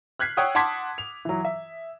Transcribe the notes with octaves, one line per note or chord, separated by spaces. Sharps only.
F6 F#6 G#6 B6 C7
C#5 F#5 G5 D#6 E6
F#5 A5 C6 D6 G#6 B6
F7
E3 F#3
E5